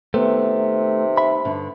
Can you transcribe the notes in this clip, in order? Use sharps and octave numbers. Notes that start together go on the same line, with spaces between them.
C3 D#3 A3 B3
E5 B5
G2 D3